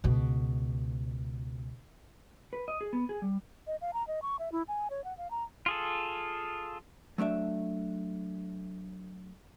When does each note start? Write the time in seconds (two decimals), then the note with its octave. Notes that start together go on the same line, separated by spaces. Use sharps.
0.04 C#2 B2
2.53 B4
2.68 D#5
2.81 G#4
2.93 B3
3.09 G#4
3.22 G3
3.67 D#5
3.81 F5
3.94 A#5
4.07 D#5
4.22 C#6
4.39 E5
4.52 E4
4.68 G#5
4.90 C#5
5.04 F#5
5.18 F5
5.31 A#5
5.66 F4 G#4 A4
7.18 F#3 A3 D4 E5